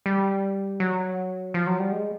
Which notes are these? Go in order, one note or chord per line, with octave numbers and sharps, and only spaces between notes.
G3
F#3
F3
F#3
G3
G#3